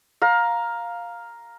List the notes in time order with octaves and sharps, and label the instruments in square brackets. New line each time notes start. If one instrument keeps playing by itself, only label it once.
[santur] F5 A#5